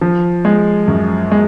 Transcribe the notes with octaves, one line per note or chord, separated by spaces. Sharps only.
F3
G#3
F#2
G#3